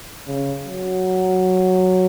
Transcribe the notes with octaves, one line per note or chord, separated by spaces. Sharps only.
C#3
F#3